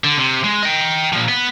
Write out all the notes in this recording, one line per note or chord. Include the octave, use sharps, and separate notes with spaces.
D3
C3
G#3
D#5 G5
A#2 F3
B3